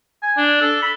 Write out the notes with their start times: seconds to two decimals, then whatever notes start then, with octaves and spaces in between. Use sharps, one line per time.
0.23 G#5
0.37 D4
0.61 A4
0.82 B5